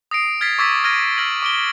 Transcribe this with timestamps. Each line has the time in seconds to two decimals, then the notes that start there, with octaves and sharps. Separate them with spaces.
0.11 D#6 A#6 C7 D7
0.41 F6 G#6 A6 B6 C7
0.58 C#6 D6 E6 G#6 A6 B6
0.84 F6 G#6 A#6 D#7
1.18 F6 A6 A#6 F#7
1.42 D6 D7 G7